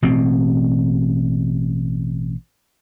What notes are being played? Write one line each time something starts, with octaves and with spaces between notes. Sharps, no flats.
A1 B2 C4